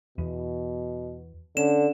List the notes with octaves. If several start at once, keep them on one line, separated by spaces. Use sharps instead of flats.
E2 B2
D3 C#4 E7